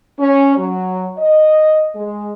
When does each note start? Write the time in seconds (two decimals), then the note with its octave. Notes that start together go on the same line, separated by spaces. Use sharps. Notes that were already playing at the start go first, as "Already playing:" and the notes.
0.20 C#4
0.57 F#3
1.19 D#5
1.96 G#3